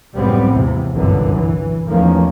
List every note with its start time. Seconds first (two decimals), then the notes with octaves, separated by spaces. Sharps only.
0.15 C#2 F#2 A2 G3 B3 C4
0.52 D#2 G#2 C3 E3
0.95 G1 C2 F#2 A#2 D3 E3
1.34 E3
1.89 E2 D#3 F3 A3 A#3 C#4